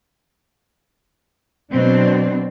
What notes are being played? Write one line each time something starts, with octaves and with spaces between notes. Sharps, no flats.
B2 F#3 C4 D4